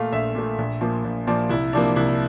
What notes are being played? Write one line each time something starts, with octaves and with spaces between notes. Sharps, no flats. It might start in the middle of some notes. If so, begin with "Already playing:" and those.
Already playing: A#2 A3 F5
A#1 E5
A#2 A3
A#1
A#2 F3 A#3
A#1
A#2 F3 A#3 D5
C2 E4
C3 F3 A#3 D4
C2 E4